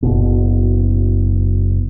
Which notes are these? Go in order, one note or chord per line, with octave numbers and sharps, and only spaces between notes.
F#1 B2